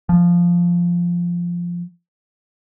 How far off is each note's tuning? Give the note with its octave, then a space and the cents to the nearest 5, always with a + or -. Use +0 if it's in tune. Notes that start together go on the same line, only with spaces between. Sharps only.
F3 -5